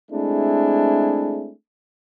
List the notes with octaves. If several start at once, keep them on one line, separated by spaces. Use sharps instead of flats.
G#3 A3 C4 D4 E4 G#4